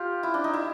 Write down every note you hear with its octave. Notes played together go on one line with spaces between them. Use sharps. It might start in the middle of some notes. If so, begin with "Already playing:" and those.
Already playing: F4 G4
E4
D4
D#4
E4